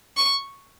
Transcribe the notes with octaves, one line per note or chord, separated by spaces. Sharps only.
C#6